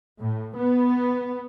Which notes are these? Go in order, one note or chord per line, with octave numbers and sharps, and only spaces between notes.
A2
B3